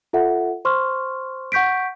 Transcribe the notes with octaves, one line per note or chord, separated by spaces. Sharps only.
F4 A4 E5 F#5
C5 C6 C#6 F6
F#5 C#6 G6 B6 D7